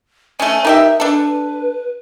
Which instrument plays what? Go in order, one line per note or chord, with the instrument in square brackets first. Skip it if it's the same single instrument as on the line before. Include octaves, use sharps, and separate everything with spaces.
[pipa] A3 C#4 [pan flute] G#5
[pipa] D#4 G4 E5 [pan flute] A#4
[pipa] D4 A4 [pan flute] B4